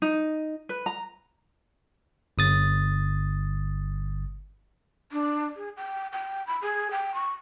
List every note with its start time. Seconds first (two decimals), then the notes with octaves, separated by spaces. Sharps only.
0.02 D#4
0.69 B4
0.86 A#5
2.38 G1 D#6 A6
5.12 D4
5.56 G#4
5.77 G5
6.12 G5
6.47 B5
6.62 G#4
6.91 G5
7.14 C#6